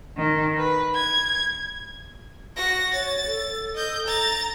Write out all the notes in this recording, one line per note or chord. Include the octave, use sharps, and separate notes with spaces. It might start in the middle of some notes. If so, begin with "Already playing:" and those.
D#3
B4
G#6
F#4 A#6
C#5 A6
A4
D#5 G6
A#5 A6